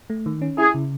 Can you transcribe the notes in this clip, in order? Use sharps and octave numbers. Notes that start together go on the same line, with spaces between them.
A3
D#3
C#4
E4 G#4
C#3